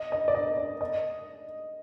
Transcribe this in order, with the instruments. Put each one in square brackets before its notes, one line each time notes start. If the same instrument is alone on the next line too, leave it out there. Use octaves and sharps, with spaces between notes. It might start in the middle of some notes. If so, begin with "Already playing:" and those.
Already playing: [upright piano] D#5
D#5
D5
D#5
D5
D#5